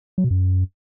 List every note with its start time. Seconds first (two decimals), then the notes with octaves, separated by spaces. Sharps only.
0.18 F#3
0.24 B2
0.31 F#2